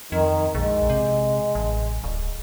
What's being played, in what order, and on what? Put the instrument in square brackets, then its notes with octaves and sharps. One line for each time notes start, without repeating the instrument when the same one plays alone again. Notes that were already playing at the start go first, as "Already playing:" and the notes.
[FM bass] F2 [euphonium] D#3
[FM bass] A#1 [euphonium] G#3
[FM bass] C3
A1
D1